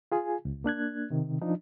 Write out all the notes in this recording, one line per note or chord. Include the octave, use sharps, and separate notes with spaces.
F4 G#4 G#5
C#2
A#3 D4 F#6 G#6
C3 D#3
F3 D4 D#4